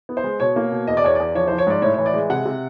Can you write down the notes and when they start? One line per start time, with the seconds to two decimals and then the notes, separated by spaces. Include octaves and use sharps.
0.09 B3
0.17 C5
0.24 G#3
0.40 B2 C#5
0.56 A#3
0.72 B2
0.87 E2 D#5
0.97 D5
1.04 E2 C#5
1.15 E2 D5
1.35 F3 C#5
1.48 F3 C5
1.58 C#5
1.67 G#2 D5
1.82 A2 C#5
1.94 E3 C#5
2.06 D5
2.14 G#3
2.30 C3 F#5
2.45 C3